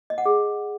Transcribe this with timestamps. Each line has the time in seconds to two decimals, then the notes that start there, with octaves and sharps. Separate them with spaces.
0.10 D#5
0.18 F#5
0.26 G#4